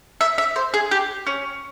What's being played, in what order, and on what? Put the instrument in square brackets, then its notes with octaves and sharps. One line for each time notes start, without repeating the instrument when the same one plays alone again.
[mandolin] E5
E5
C5
G#4
G4
C#4